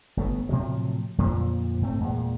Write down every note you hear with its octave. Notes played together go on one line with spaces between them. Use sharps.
G1 A3 B3
A2 C3 F3 F#3
F2 A#2 D3 F3
A2 A3 C4
E2 A#2 G#3